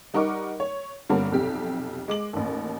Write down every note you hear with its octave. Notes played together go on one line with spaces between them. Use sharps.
G3 D#4 A#4 F#5 C#6 D6
C#5
G2 D3 G3 A#3 B3 C#4
B1 F2 C3 G4
G#3 D6 F#7
A1 D#2